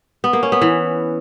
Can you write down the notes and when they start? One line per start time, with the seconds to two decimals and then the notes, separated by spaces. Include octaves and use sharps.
0.24 B3
0.33 A#3
0.43 C#4
0.52 B3
0.62 E3